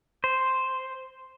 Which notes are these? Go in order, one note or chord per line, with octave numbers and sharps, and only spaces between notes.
C5